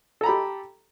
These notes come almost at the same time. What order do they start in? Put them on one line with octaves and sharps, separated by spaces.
A4 A#5 B5 G4